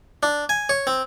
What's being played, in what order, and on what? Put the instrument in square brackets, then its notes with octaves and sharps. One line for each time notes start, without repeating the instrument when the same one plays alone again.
[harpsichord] D4
G#5
C#5
C4